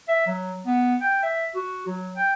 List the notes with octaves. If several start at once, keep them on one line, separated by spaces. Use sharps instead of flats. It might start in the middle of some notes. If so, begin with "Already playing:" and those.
E5
F#3
B3
G5
E5
F#4
F#3
G5